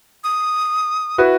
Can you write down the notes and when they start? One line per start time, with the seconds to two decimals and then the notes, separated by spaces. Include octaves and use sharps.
0.24 D#6
1.18 E4 F#4 B4